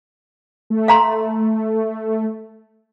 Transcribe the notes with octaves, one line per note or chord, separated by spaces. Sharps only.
A3
F5 A#5 C6